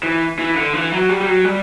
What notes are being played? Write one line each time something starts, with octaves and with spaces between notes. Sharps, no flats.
E3
E3
D3
E3
F#3
G3
G3
F#3
G3